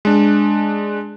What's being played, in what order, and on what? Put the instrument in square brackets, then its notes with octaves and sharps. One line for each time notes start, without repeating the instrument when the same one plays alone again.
[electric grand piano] G#3 D4